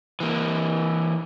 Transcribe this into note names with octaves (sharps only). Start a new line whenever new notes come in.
E3 A#3